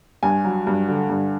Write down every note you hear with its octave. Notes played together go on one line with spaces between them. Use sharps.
G2 G#5
F#3
G2
D3
G2